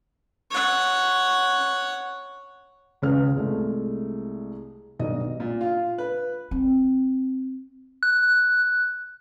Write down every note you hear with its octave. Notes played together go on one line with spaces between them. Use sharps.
C#5 F#5
C#2 C#4 G#4 B4 F6
C2 G#3 A3
B1 G2 D#5
A#2
F4
B4
C4
F#6